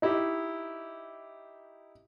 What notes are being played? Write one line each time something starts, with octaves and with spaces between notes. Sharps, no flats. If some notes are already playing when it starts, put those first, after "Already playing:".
D#4 E4 G4